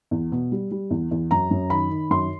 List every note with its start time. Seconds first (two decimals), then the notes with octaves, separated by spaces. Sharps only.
0.11 E2
0.32 B2
0.52 G3
0.71 G3
0.91 E2
1.11 E2
1.31 F#2 A#5
1.51 F#2
1.70 D#3 B5
1.91 D#3
2.10 F#2 C6